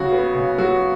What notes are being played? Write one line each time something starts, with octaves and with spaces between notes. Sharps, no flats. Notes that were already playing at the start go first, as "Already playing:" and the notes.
Already playing: C#3 F#3 F#4
B3
C#3
F#3 F#4